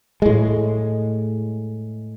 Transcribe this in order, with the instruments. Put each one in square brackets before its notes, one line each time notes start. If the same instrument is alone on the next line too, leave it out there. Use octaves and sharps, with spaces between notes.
[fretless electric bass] A2 G#3